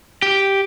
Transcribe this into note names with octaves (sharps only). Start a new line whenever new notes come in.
G4